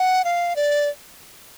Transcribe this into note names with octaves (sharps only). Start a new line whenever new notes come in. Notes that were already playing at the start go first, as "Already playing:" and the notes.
Already playing: F#5
F5
D5